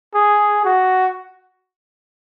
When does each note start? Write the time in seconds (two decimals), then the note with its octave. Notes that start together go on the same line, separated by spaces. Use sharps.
0.14 G#4
0.65 F#4